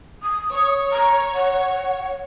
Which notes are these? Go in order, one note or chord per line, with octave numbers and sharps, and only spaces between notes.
D#6
C#5
A#5
F#5